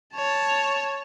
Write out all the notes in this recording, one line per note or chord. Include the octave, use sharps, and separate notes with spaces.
C#5 A5